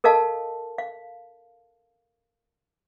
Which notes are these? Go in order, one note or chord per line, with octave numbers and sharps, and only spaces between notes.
A4 A#4 D#5 F5 A5
F5